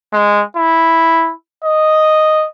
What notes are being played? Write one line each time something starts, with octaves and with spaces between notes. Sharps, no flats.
G#3
E4
D#5